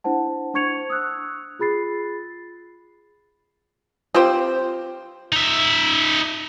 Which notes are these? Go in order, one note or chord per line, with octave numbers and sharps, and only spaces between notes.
D4 E4 C5 F#5 A5
D4 C5 C#6 G#6 C#7 F7
D#6 E6 F#6
F4 G#4 B5 A6 C7
C4 F4 G4 C5 G5
D#4 E5